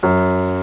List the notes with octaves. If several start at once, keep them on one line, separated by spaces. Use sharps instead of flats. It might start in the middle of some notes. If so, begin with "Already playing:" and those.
F#2